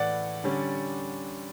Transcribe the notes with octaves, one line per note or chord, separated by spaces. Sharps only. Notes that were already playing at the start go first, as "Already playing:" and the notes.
Already playing: A2 E3 A3 D5 F#5
D3 G3 C#4